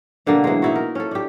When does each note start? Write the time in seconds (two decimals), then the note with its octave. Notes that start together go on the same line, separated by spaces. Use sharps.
0.26 B2 D3 G3 A#3
0.44 E3 F#3 G#3
0.62 D#4 E4 F#4
0.75 A#4
0.95 C#4 A4
1.11 D4 G4